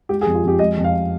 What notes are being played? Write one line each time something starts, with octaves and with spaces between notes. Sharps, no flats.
G#3 G4
G#4
F2
F4
F2 G4
G#3 D#5
F2
F5